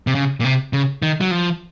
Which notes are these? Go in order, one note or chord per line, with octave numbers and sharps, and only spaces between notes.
C3
C#3
A#2
C3
C#3
D#3
F#3
F3